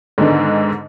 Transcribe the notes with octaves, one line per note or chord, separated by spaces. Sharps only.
G#2 D3 D#3 G#3 B3 D4